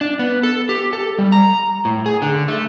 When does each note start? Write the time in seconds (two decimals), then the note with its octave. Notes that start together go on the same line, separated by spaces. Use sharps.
0.01 D4
0.19 B3
0.43 A4
0.69 G4
0.93 A4
1.19 G3
1.32 A#5
1.85 A2
2.06 G#4
2.22 D3
2.48 A3